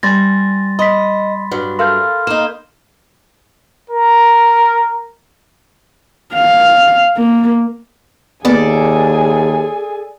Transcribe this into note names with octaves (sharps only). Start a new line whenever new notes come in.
G3 G#5 C6 A6 A#6
D#5 B5 C6 B6
G2 F#3
A4 A#4 F5 C6 F6 G6
A#3 D#4 E7
A#4
F5
A#3
D#2 A#3 B3 G#4 A4 D5 G#5